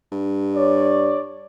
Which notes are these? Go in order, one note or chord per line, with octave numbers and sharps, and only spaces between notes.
G2
C#5 D5